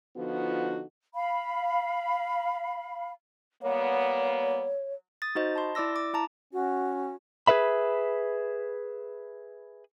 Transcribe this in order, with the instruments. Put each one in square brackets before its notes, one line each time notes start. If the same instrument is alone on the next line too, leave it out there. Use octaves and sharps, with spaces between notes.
[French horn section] D3 F3 B3 D#4 F4 F#4
[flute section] F5 B5
[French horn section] G3 A#3 B3 [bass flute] C#5
[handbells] D#6 A6
D#4 F#4 C5 D#5
A5 B5 C6
E4 D5 D6 E6 A#6
D6
E4 A5 A#5
[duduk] C#4 [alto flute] F#4
[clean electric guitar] G#4 A4 B4 E5 B5